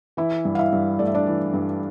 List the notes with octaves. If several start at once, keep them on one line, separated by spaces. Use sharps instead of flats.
E3 E4 E5
G2
F5
E4 E5
G2
A3 D5
E5
D4 D5
E3
G2